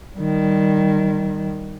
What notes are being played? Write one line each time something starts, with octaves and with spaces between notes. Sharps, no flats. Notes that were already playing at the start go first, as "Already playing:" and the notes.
D#3 G3